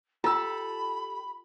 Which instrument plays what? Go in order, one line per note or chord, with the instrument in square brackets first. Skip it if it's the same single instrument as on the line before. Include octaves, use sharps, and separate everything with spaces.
[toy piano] F4 [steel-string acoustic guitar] G4 A4 [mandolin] A5 E6 [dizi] B5